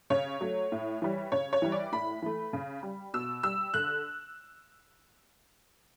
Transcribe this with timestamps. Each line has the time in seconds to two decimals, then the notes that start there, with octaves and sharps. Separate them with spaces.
0.10 C#3 C#5
0.41 F#3 A3
0.72 A2
1.02 E3 G3
1.32 C#3 C#5
1.53 C#5
1.62 E3 G3
1.72 D5
1.92 A2 B5
2.22 E3 A3
2.53 C#3
2.83 G3
3.14 B2 E6
3.43 G3 E6
3.74 D3 F#6